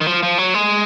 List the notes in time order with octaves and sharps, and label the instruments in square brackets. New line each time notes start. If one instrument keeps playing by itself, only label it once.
[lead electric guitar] D#3
F3
F3
F#3
G#3